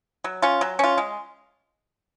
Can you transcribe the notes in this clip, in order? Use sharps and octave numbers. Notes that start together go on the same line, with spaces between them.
F#3
C#4 F4
F#3
C#4 F4
G#3